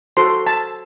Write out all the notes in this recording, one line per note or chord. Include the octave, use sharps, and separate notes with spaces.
F#4 A4 C5 C6
A5